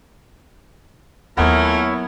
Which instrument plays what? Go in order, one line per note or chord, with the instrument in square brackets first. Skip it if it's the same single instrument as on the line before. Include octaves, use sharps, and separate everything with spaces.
[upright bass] D#2 F#3 [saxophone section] A#2 A3 A#4 [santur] B3 [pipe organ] E4 C#5